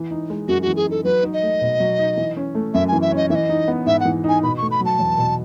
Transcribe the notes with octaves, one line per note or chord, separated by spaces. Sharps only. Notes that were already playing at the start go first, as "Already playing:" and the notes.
Already playing: E3
D#4
G#3
F#2 F#4
F#4
E3
G#4
D#4 A4
F#3 B4
D#4
D#5
A3
B2
F#3
D#4
E3
C#4
A3
F#2 E5
E3 G#5
E5
C#4 D#5
E3 D#5 E5
D#4
B3
G#2 E5
F#5
E3
D#4 G#5
B2 B5
A3 C#6
B5
F#3 A5
E2
B2